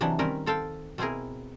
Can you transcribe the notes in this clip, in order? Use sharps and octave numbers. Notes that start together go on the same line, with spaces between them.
C3 E3 F#3 D4 D#4
D#3 G3 C4 C#4 A#4
C4 A4 F5 G5
B2 C4 E4 G#4 A#4